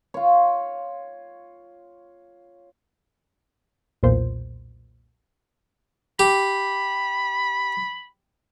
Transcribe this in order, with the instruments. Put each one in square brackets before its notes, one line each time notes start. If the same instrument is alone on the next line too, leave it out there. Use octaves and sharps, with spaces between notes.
[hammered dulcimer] F4 C#5
[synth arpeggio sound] B1 E2 A#2 C5
[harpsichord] G4 [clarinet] B5